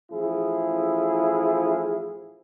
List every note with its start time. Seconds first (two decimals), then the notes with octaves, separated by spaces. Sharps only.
0.11 A1 F3 E4 G#4